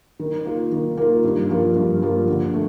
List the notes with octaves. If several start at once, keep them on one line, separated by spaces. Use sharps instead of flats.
D#3
A#3 F4
D#3
A#3 F4
G2
F3 A#3 F4
G2
F3 A#3 F4
D3
A3